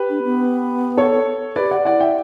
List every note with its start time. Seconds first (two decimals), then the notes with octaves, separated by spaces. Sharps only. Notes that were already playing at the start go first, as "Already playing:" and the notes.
Already playing: G4 B4
0.09 D4
0.23 B3
0.97 A4 C#5
1.56 G4 A4 B4 D5
1.71 D5 F#5
1.85 E4 D5 F#5
2.00 E5 G5